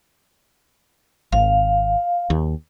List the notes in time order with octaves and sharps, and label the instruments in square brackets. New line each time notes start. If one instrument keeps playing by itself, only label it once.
[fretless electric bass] G#1 [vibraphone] F5
[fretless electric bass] D#2